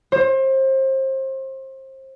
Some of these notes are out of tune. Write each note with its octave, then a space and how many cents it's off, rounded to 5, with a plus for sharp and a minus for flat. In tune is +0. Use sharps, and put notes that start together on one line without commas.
C5 +30